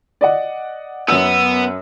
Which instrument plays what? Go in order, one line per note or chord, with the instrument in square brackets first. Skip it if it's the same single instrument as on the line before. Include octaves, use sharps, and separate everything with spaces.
[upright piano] D5 D#5 F#5
[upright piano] F#2 E6 [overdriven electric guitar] B3